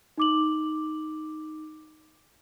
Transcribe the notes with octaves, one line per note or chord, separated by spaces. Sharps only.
D#4 D6 F#7